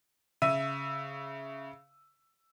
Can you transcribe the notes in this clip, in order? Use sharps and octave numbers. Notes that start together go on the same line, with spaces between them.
C#3 E5 E6 D#7